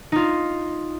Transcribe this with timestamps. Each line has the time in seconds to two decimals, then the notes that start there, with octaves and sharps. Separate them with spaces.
0.12 D#4 F4